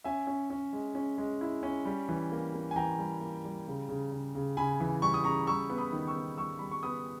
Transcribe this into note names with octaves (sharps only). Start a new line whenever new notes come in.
C#4 E5 G#5
C#4
C#4
G#3
C#4
G#3
E4
C#4
G3
E3
A#3
A#3
G#5
E3 G5 A#5
G3
A#3
G3
C#3
C#3
C#3
C#3
C#3 G#5 B5
E3
G3 C#6
D#6
C#3 A#5 C#6
G3 C#6 E6
B3
B5 D#6
D#3
C#6 E6
B3
G3 C#6 E6
G3 B5
C#6
B3 B5 D#6